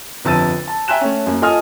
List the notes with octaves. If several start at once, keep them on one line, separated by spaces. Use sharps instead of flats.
G1 F2 A5 E6 A6 D#7
A5
E5 G5 G#5 A#5 F#6 E7
A3 C#4
F#2 A#3
F4 A4 D#5 G#5 D#6 F6